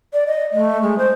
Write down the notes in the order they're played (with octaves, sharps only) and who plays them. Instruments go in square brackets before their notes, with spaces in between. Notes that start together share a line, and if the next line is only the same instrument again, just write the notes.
[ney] D5
D#5
A3
G#3
C5